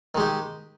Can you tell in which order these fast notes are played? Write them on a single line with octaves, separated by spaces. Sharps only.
D#3 G#3 G4